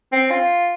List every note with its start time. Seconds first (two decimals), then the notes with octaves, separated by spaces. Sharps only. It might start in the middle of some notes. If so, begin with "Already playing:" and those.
0.12 C4
0.30 F4